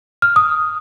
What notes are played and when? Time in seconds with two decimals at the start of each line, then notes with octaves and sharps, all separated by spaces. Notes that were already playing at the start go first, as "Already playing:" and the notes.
0.22 F6
0.36 D#6